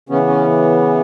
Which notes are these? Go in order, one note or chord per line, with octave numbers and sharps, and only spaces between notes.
C#3 E3 B3 C#4
C#4